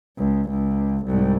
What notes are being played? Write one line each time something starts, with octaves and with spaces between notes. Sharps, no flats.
C#2
C#2
C2 G#2